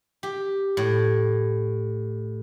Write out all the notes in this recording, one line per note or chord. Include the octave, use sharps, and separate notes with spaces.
G4
A2